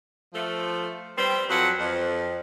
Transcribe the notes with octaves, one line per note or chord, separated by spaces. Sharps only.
F3 A3
G3 B3 C4
F2 F#3 B4 F#5
F2